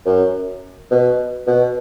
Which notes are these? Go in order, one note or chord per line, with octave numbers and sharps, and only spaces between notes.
F#2
B2
B2